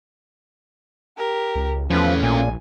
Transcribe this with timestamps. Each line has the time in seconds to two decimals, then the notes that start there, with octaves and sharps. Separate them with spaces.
1.18 G4 A#4
1.55 C#2
1.90 E2 F3 A3 C#4 B4
2.23 A#1 A#2 G#5